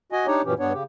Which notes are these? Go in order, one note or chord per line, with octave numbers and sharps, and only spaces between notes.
F#4 D#5 G#5
D4 D#4 G4 C#5
F#2 A#2 E3 C#4 G4
G2 B3 D4 C#5
C#3 G4